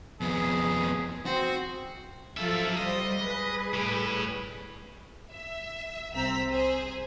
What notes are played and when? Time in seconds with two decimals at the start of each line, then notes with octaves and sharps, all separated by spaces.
0.21 F2 B3 G#4
1.26 C4 F#4
2.37 F3 F#3 A4 E5 F5
2.77 G3 C5 D#5
3.21 G3 G#4 B4
3.74 A2
5.32 E5
6.14 C2 C4 A#5 E6 B6
6.50 G#4 C5